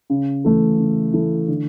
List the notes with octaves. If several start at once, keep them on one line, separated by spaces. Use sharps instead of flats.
C#3
E3 A3 E4 A4
C#3
E3 A3 E4 A4
D3